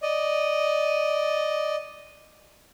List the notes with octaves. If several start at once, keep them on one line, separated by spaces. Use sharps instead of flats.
D5 D#5